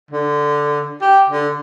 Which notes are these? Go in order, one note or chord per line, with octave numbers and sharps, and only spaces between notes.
D3
G4
D3